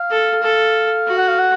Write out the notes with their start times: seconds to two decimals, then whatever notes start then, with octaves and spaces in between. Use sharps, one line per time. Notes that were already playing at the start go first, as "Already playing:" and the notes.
Already playing: F5
0.10 A4
0.42 A4
1.07 F#4
1.18 F#5
1.28 F5
1.39 F#5